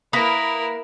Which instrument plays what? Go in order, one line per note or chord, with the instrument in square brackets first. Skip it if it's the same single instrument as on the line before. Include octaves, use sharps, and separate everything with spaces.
[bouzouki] A#3 B4 [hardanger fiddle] E4 A#4 [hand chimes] D#6 B6